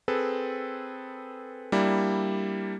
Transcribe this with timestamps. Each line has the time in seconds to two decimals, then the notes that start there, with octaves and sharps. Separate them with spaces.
0.08 C4 G#4 A4 B4
1.72 G3 A#3 D4 E4